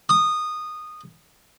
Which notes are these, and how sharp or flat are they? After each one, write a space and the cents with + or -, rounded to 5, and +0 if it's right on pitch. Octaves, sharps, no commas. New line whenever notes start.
D#6 -15